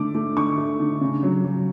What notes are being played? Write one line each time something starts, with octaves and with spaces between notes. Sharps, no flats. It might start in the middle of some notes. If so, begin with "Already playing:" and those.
Already playing: D3 A3 D6
A3
D3 C#6
A3
D3
C#3
F#3
F#3